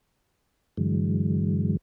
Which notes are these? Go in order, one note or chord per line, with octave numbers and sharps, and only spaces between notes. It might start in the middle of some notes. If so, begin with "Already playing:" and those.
G2 D3 E3 F#3 G#3